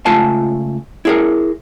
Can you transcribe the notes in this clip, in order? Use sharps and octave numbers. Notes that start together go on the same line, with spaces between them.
C#2 A3 F4 G#5 A5
E4 G#4 A#4